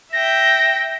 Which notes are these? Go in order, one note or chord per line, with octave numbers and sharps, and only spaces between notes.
E5 G5 A#6